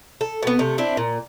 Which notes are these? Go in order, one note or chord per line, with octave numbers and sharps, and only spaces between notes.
A4
B2 B3
C3 A3
C4 D4 E4
A#2